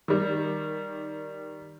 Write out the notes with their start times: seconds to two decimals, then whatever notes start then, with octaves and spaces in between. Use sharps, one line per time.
0.08 D#3 G3